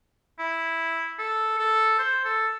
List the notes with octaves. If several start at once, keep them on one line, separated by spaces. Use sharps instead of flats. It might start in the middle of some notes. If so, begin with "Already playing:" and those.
E4
A4
A4
C5
A4